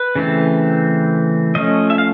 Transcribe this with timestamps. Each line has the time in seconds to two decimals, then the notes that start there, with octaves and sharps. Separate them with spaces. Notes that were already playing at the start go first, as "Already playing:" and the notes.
Already playing: B4
0.15 C#3 E3 A3 C4
1.55 F3 A3 C#4 D#5
1.90 E5
1.98 F5